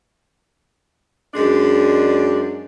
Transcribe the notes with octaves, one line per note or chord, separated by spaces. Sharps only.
F#2 G#3 D4 D5